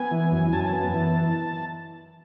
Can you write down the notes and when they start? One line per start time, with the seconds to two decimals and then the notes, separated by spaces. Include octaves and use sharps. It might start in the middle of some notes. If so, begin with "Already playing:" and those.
Already playing: B3 G#5
0.11 E3
0.32 F#2
0.53 F#2 A5
0.60 G#5
0.66 A5
0.73 B3
0.94 E3